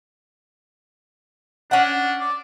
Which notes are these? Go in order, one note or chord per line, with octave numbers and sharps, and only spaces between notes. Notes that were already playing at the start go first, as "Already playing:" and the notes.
C#4 D4 F#5
D5